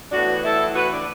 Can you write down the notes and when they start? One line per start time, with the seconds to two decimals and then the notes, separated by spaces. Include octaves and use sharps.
0.11 A2 E3 B3 D4 F#4
0.43 E4 A4
0.75 F#4 B4
0.92 D4